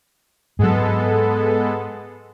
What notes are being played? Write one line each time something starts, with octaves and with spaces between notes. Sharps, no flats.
G#2 F#3 G#3 B3 A4